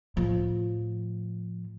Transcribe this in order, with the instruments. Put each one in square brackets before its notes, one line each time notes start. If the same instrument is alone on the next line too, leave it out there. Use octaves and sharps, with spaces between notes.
[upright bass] A2 F3